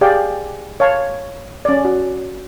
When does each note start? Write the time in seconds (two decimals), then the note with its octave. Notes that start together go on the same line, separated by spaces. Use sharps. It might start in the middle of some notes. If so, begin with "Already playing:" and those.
0.01 G4 G#4 D5 F5 G5
0.80 C#5 F5 A5
1.65 C#4 D5
1.85 F#4